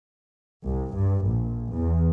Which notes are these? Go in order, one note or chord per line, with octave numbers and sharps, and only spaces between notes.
C2
G2
A#1
E2